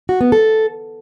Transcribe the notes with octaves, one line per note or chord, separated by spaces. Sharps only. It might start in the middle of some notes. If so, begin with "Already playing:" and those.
F#4
B3
A4